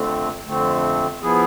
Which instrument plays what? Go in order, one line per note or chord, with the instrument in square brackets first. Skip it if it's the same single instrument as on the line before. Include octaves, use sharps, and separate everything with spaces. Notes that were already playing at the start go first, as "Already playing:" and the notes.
Already playing: [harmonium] F2 D3 A3 C4
F2 D3 A3 C4
F3 B3 E4 G#4